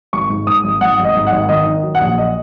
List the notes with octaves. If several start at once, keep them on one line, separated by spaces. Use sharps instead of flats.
G#1 C#6
G#2
G#2 D#6
G#1
G#1 F#5
G#1
D#5
G#2
F#5
G#1
D#3 D#5
D#3
F#3
F#5
A#1
D#5